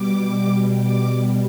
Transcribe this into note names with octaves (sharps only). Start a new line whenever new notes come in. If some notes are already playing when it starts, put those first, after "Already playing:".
Already playing: B2 G3 D6
D6